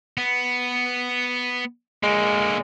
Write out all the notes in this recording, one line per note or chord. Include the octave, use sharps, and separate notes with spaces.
B3
D3 G#3 A#3